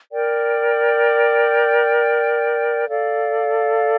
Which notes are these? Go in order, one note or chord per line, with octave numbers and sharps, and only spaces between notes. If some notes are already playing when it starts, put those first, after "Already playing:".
A#4 D5 G5
A4 D5 F5